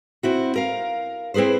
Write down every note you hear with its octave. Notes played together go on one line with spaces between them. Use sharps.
C4 E4 F#4
A#4 F5
C4 E4 G#4 B4 C5